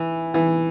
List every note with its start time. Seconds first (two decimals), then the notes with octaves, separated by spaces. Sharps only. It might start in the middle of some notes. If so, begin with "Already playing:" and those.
Already playing: E3
0.34 E3